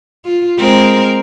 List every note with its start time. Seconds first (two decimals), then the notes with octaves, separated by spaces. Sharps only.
0.25 F4
0.59 G#3 C4 A#4